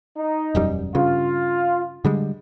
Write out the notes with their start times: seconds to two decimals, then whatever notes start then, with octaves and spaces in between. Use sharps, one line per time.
0.17 D#4
0.55 E1 F#2 G3
0.95 G2 C#3 F4
2.05 D3 G3 G#3